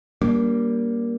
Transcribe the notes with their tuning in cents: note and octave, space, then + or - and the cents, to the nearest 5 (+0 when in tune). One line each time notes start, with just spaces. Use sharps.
G3 +0 A#3 +10 D4 -30